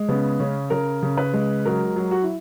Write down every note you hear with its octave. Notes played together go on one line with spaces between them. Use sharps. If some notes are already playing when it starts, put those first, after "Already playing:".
Already playing: G#3
C#3 B3
C#3 C#4
C#3 A#4
C#3
B4
G#3
F#3 A#4
F#3
F#4
E4